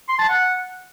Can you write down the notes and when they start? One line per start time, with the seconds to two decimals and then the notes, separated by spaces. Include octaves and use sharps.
0.09 C6
0.19 A5
0.29 F#5